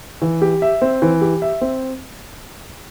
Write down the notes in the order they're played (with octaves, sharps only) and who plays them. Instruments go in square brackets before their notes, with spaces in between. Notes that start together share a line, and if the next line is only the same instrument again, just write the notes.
[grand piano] E3
G4
E5
C4
E3
G4
E5
C4